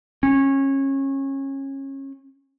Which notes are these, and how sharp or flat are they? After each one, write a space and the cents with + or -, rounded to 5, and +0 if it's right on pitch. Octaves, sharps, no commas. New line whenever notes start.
C#4 -25